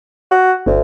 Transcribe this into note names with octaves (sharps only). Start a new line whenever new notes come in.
F#4
G1 D2